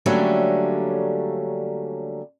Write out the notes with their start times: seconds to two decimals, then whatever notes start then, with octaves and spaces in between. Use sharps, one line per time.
0.06 D3 F#3 G3 A3 A#3 C#4